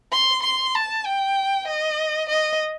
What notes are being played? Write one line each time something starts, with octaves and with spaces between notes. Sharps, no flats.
C6
C6
A5
G5
D#5
D#5